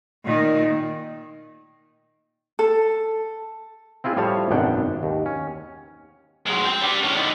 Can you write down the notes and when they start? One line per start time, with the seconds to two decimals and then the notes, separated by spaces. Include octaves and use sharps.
0.25 A#2 D#3
2.59 A4
4.04 C4 E4 F4 G#4
4.17 A2 F3 G3 C#5 F5 A5
4.51 G#1 F#2 B2 D4 F#5 G5
5.03 D#2
5.26 C#4
6.47 F#3 G#3
6.66 C4 G5
6.81 G3 D4
7.03 A2 C#4
7.16 D3 D#3